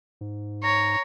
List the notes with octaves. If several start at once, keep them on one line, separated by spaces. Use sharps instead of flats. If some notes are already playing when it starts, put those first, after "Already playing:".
G#2
C#5 A#5